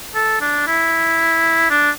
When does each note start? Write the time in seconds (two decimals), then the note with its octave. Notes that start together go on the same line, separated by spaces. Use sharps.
0.15 A4
0.41 D4
0.67 E4
1.70 D4